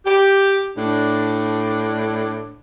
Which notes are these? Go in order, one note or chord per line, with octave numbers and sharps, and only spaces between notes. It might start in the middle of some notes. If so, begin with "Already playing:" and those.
G4
A2 D4